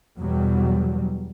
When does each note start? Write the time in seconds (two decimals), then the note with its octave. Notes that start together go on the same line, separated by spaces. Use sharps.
0.18 E2 B2 F#3 G3